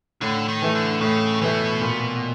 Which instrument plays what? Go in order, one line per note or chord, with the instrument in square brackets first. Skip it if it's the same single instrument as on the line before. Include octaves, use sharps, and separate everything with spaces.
[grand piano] A2 [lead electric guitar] D3
[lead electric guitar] D#3
[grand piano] E3 A3
[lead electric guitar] D3
[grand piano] A2 [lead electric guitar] C#3
[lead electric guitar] B2 [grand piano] E3 A3
[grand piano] A#2